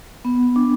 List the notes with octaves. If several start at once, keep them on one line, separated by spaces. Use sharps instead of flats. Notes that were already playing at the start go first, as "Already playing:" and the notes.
B3
D4